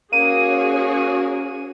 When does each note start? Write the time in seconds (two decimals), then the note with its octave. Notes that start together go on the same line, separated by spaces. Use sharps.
0.13 A#3 C#4 F#4 G#4 C#5 D#7